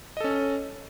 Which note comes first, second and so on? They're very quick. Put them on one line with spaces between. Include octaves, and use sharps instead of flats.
D#5 A4 C#4